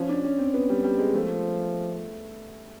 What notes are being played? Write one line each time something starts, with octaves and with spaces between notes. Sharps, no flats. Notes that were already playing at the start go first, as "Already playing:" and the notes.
Already playing: F3 C#4
D4
C#4
C4
B3
G3
G3
G#3
F3 A3